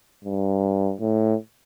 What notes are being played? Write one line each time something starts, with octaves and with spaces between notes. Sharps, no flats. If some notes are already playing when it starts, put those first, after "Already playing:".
G2
A2